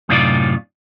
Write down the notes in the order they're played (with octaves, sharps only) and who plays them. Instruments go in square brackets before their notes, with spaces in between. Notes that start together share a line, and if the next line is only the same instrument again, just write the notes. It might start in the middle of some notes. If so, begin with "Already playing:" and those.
[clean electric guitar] F#2 A2 C3 D#4 F4 D5